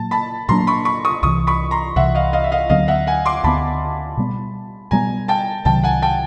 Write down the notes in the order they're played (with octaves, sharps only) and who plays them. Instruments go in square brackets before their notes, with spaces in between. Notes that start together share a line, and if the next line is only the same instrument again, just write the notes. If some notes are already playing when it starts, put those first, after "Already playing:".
Already playing: [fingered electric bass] A#2 F#3 A#3 [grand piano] A5
[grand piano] A5 B5
[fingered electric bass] A#2 F#3 A#3 D4 [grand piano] A#5 C6
[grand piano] B5 C#6
B5 C#6
C#6 D#6
[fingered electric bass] C2 C3 E3 [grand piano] C#6 D#6
[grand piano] B5 C#6
A#5 C6
[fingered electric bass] C2 C3 E3 [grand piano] E5 F#5
[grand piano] D#5 F5
D#5 F5
E5
D#5 F5
[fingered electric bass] D2 D3 F#3 B3 [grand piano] D#5 F5
[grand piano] E5 F#5
F#5 G#5
C6 D6
[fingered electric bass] D2 D3 F#3 B3 [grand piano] A5 B5
[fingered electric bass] B2 G3 B3
[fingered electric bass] B2 G3 B3 [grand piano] G#5 A#5
[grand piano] G5 A5
[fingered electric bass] C2 C3 D#3 F#3 [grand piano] G5 A5
[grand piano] F#5 G#5
G5 A5